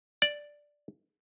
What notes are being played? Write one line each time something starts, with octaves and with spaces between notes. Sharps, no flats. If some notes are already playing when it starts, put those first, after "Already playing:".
D5